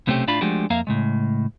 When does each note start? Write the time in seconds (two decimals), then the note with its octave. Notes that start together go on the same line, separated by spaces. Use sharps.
0.07 B1 C3 A3 C4 C#4 G4
0.27 A2 A3 D4 F4 F5 B5
0.41 F3 G#3 A3 D4 F#4 G4
0.70 F2 A#3 E5 F5 A#5
0.87 A2 C#3 G#3